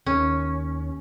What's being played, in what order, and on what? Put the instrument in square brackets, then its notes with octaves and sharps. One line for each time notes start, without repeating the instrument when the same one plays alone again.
[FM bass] D#2 [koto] C#4